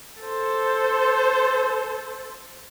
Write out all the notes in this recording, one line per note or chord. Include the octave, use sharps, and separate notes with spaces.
A4 C5